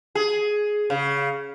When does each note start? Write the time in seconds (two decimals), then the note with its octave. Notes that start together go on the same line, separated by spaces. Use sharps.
0.15 G#4
0.90 C#3